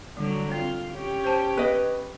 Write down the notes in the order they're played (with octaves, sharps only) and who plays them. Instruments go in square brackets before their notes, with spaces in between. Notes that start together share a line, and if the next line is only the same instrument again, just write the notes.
[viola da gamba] D3 F#3 [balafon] G3
[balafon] C4 [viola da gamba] F4
[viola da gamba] C#4 G4 C#5
[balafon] C5 A5
[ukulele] B4 D#5